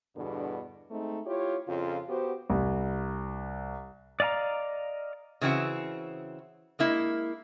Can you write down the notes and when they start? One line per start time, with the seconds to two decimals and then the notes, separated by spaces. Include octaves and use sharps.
0.16 E2 G2 B2 D3
0.90 G#3 A3 C4 D#4
1.26 E4 F4 G4 C#5
1.68 F2 C#3 F4
2.08 B3 F#4 G4 C5
2.50 C2
4.20 D5 D#5 F5 G#5 A#5
5.41 C#3 E3 C4 F#4 E5
6.79 G#3 A#3 E4